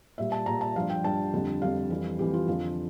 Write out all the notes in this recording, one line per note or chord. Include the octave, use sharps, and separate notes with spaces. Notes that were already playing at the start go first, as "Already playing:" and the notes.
A#2 G3 E5
A5
A#2 G3 A#5
A5
G2 F3 F5
G5
G2 F3 A5
F2 D3 G3
F2 D3 G3 F5
F2 E3 G3
F2 E3 G3 G4
F4
F2 D3 F3 F4